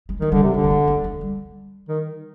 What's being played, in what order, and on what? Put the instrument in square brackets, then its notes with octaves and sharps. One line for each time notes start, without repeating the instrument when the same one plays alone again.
[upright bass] G#3
[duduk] D#3 [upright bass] G#3
[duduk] D3 [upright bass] G3
[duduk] C3
[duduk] D3 [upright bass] G#3
[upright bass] A#3
G#3
A#3
G#3
G3
[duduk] D#3